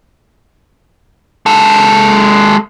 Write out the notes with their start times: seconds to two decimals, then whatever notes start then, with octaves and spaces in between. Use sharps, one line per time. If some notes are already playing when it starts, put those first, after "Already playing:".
1.46 G#3 A4